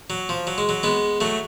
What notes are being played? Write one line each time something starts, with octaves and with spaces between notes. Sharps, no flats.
F#3
F3
F#3
G#3
F#3
G#3 B3
F#3 A3